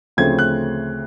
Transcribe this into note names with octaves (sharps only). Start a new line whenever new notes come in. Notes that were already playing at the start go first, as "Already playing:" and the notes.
D2 C#3 F3 A3 C4 G#6
F#6